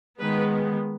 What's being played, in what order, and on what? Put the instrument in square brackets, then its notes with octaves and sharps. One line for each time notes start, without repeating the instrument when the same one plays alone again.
[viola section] D#3 G#3 B3 B4